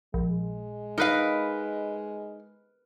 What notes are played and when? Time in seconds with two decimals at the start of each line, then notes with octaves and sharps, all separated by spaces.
0.14 A#1 G#3
0.98 D#4 A#4 B4 F5